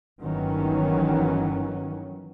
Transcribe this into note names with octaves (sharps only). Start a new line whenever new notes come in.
G1 D#3 E3 F#3 C#4